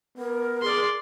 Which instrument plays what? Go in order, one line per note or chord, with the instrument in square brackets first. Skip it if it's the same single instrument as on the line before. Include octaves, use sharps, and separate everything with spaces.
[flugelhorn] B3 [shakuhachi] A#4
[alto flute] G#4 [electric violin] D5 C6